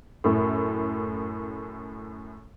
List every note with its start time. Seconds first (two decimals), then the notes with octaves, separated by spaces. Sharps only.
0.24 F#2 A2